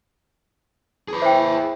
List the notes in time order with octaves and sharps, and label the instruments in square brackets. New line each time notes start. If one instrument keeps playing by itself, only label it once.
[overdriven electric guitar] G#4 B4
[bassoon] E4 [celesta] C5 G5